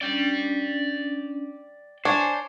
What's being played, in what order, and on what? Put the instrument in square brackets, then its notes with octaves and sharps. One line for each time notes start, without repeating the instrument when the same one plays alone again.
[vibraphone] C#4 D4 [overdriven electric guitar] D5 G5
[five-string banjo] D4 [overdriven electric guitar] C5 [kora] C#5 [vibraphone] G#5